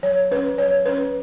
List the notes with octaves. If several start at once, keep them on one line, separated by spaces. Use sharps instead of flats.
F#3 C#5
C#4 B4
F#3 C#5
C#4 B4